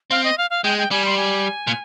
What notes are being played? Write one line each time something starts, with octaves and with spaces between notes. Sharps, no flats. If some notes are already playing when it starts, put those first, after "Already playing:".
C4 F5
D#5
F5
F5
G#3 G5
G5
G3 G#5
C6
G#5
A#2